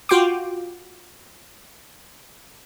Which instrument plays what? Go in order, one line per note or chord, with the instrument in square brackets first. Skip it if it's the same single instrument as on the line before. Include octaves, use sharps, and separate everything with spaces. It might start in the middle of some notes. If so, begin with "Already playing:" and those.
[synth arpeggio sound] F4 F#4 G5 C6 D6